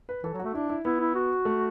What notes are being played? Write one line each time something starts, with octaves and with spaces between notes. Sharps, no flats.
B4
E3 A4
F#3
A3 F#4
D4 E4
E4
B3 E4
E4
F#4
A3